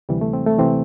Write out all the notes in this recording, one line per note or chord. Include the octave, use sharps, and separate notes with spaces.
D2 C3 E3 G3
A3
C4
A3
C3 E3 C4